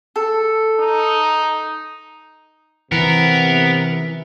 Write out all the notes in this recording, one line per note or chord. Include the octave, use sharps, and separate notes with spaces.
A4
D#4
C3 E3 B3 A#4